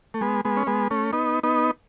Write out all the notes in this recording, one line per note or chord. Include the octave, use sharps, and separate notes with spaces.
A3
G#3 B3
G#3 B3
C#4
G#3 B3
A3 C#4
B3 D#4
B3 D#4